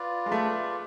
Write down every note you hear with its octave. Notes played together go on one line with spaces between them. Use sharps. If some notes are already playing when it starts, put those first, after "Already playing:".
Already playing: F4 B4 D5
G#3
A3